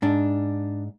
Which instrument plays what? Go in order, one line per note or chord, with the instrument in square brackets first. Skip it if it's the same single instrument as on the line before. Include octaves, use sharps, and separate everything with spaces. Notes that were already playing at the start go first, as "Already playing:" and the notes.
[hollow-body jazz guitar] G#2 D4